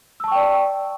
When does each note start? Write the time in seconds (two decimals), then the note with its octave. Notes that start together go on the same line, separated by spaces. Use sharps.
0.20 E6
0.24 A5
0.28 C#6
0.32 G5
0.35 D5